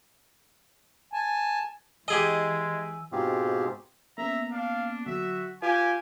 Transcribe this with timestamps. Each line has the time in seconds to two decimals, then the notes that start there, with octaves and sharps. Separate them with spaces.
1.13 G#5 A5
2.08 E3 G#3 G4 G#4 D#5 G#5 E6 D#7
3.12 G#2 B2 C4 F4 G4 G#4
4.18 A#3 B3 C#4 E5 A#5
4.52 D4 F5
5.06 D3 F#3 F#4 E5
5.62 F4 G4 B4 G#5